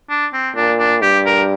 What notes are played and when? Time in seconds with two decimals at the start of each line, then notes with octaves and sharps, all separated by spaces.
0.10 D4
0.33 C4
0.56 A#2 D4
0.79 D4
1.02 G2 G4
1.26 A#4